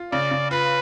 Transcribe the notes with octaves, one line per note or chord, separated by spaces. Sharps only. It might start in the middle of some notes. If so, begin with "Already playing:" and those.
Already playing: F4
C#3 D5
C#3
F4 B4